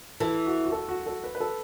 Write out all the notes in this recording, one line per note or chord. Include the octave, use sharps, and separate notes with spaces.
E3 A4
F#4
F#4
A4
F#4
A4
B4
B4
A4